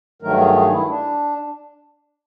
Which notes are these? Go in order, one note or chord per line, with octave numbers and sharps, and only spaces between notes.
G2 D#3 F#3 A3 A#4
G#4
G#4
E4
D4